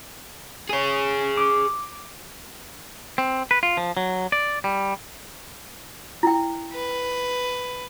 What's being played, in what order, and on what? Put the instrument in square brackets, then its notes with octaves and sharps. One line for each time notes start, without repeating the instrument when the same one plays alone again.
[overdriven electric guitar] G#4 C#5
[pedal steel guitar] D6
[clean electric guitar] C4
B4
F4
F3
F#3
D5
G3
[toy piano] E4 G5
[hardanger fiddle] B4